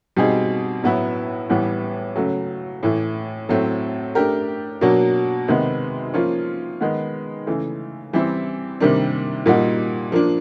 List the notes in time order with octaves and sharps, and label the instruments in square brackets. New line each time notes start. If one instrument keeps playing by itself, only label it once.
[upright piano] B2 G3 C4 D#4 G#4
A2 F#3 B3 E4
A2 E3 G3 B3
C#3 F#3 A3
A2 E3 A3
A2 F#3 A3 C4
A3 D4 G4 A#4
B2 F#3 A#3 D4
C3 D#3 G#3 B3
F3 A#3 C#4 F4
D#3 G#3 B3
C#3 E3 A3
E3 G3 C4 E4
C3 D#3 G3 A#3 D4
A#2 G3 A#3 D#4 F#4
F3 A#3 D4